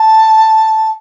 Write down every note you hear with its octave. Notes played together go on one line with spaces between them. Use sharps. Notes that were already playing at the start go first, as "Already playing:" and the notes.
Already playing: A5